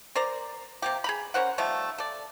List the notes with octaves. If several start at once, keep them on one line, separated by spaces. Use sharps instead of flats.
A#4 C5 D5 A#5
C3 A#3 G4
G#4 A#5 B5
C#4 A#4 C5 F#5
D#3 F3 G3 A3
A4 D5